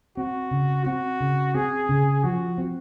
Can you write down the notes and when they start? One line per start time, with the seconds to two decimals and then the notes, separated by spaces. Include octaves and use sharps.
0.17 C4 F#4
0.51 C#3
0.85 C4 F#4
1.20 C#3
1.55 C4 G#4
1.89 C#3
2.23 F3 F#4
2.58 C4